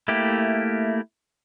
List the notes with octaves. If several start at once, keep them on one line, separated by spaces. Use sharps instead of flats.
A3 A#3 E4 G4